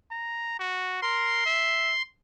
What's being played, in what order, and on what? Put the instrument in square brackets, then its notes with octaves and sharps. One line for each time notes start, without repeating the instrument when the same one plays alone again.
[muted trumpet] A#5
F#4
[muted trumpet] A#4 [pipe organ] C6
[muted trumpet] E5